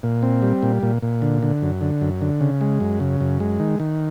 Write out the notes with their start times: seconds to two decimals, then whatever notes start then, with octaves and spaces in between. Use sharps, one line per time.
0.03 A#2
0.23 C4
0.42 G3
0.63 A#2
0.83 A#2
1.02 A#2
1.22 D3
1.43 D3
1.62 F#2
1.81 D3
2.01 F#2
2.21 D3
2.41 C#3
2.61 G#3
2.80 F#2
3.00 C#3
3.21 F#2
3.40 G#3
3.60 D#3
3.80 D#3